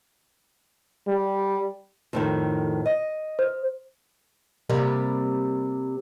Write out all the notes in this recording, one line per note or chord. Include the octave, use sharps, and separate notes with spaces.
G3
F2 A2 D#3
D#5
C5
C3 G3 A#3